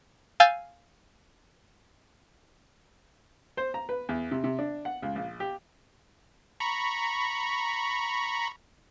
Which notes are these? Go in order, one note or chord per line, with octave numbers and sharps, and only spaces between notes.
F5 G#5 E6 G6 A6
C5
A#5
B4
E2
C3
C3
D4
F#5
C#2
A#1
G4
A#5 B5 C#6